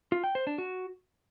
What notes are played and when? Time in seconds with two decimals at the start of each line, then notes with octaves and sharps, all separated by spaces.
0.12 F4
0.24 G5
0.35 C5
0.47 D4
0.58 F#4